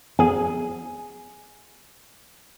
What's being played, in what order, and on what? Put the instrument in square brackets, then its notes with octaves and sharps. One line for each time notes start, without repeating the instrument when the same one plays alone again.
[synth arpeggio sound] F3 B3 G#4 [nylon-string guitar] G#5